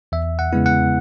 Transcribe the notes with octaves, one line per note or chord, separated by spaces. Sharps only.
E2 E5
F#5
C#3 G#3 B3 E4
F#5